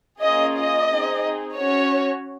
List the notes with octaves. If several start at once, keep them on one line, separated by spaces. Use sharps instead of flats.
A#3 C#4 F4 G#4 D#5
D#5
C4 D#4 G#4
C#4 F#4 C#5